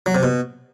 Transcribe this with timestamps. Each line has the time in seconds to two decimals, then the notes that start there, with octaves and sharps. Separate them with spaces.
0.06 F#3
0.15 C3
0.23 B2